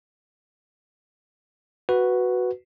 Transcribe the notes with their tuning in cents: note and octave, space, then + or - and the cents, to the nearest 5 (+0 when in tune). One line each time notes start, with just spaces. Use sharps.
F#4 +0 B4 +0